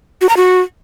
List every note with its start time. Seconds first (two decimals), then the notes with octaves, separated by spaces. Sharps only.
0.22 F#4
0.29 A#5
0.37 F#4